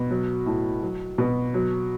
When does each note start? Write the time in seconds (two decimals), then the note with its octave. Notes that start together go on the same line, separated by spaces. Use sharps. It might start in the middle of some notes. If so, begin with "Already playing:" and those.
Already playing: B2
0.10 F#3
0.46 A2
0.82 F#3
1.18 B2
1.54 F#3